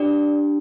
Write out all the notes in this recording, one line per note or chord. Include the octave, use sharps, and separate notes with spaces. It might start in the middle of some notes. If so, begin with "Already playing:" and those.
Already playing: D4 G4 D5